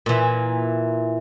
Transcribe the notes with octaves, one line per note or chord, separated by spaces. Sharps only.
A#2 E3